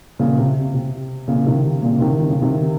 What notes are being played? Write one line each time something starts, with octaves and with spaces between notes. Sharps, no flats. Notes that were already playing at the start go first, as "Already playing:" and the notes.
A#2 C#3
C3
C3
A#2 C#3
C3 D#3
C3
A#2 C#3
C3 D#3
D#3
C#3
C3 D#3